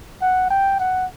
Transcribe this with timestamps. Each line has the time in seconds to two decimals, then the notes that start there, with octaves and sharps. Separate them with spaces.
0.22 F#5
0.50 G5
0.80 F#5